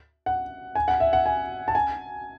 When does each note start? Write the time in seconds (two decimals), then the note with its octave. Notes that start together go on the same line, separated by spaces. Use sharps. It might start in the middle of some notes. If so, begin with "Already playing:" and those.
0.26 F#5
0.75 G#5
0.88 F#5
1.00 E5
1.13 F#5
1.26 G#5
1.68 A5
1.75 G#5